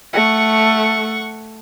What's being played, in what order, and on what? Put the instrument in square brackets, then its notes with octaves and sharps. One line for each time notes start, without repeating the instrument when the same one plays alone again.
[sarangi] A3 [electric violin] F#5 C#6